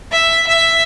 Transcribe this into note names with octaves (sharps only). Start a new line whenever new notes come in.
E5
E5